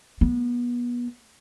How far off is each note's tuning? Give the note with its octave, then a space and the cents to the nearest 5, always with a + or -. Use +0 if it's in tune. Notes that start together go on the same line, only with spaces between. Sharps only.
B3 -30